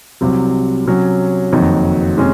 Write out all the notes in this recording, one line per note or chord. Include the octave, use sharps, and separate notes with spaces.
C2 C3 F#3
C3 F#3 C#4
F#1 F2 D#3 F#3
C3 D#3 G#3 C#4